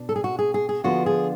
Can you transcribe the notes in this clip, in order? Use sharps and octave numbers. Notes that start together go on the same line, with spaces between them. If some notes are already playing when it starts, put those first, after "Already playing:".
Already playing: B2 D4
A4
G#4
F#4
G#4
G#4
G#4
D3 F3 B3 D4 F4 F#4
G#4